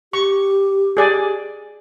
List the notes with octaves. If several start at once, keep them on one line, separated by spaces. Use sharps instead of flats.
G4 C#6
G#4 D5 G#5